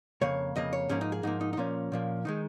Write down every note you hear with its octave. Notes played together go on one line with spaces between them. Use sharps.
F2 C#3 A#3 C#5
F2 C#3 A#3 D#5
C#5
G#2 F3 A#3 C#4
D#4
G#4
G#2 F3 A#3 D#4
D#4
D#4
A#2 F3 A#3 C#4
A#2 F3 A#3
D#3 G#3 D#4